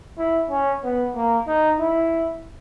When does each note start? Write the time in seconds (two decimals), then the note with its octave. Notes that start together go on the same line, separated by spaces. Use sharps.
0.18 E4
0.50 C#4
0.83 B3
1.16 A#3
1.47 D#4
1.79 E4